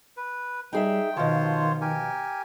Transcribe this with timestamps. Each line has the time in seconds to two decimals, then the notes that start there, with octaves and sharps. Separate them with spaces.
0.17 B4
0.73 G3 D#4 G#4 E5 G5
1.17 B2 D#3 F3 F4 C5 C#5
1.81 G4 A#4 G#5